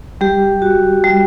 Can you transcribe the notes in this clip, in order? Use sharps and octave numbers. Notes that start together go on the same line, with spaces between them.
G3 G4
F#4
G3